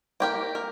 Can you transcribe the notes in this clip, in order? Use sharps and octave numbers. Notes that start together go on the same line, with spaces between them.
A#3 G4 A#4
A#4